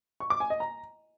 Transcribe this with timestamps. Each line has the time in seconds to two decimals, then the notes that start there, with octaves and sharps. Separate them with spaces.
0.20 C#6
0.30 D6
0.40 G#5
0.50 D#5
0.60 A#5